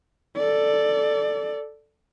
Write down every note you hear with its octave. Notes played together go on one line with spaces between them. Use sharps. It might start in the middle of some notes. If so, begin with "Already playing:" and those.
A4 D5